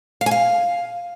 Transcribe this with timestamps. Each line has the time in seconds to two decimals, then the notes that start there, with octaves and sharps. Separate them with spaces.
0.21 F5
0.26 G#5
0.31 F5